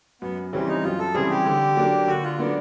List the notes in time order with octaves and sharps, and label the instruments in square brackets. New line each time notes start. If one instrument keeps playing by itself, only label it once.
[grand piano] F#2 [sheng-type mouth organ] B3
[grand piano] C#3 E3 G3 C4 [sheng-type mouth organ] C#4
[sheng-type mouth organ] D#4
[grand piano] F#2 [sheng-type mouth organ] F4
[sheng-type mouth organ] A4
[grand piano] C#3 E3 G3 C4 [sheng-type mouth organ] G#4
[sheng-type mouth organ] G4
[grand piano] D3
F#3 A#3 D4
[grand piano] D3 [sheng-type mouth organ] F#4
[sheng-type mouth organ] F4
[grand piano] F#3 A#3 D4 [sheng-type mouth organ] B3